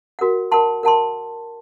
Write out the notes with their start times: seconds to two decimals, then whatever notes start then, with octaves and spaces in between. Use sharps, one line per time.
0.19 F#4 A#4 F#5
0.52 A#4 F#5 A5 C6
0.83 A#4 F#5 A5 C6